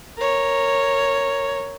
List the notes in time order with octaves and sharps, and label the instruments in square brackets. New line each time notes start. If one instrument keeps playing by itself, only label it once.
[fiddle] A#4 C#5